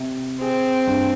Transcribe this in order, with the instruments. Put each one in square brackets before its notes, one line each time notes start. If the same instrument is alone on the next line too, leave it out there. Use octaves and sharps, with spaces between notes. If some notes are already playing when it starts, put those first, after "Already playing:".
Already playing: [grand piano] C3
[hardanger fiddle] C4 [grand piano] G#4
[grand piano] G2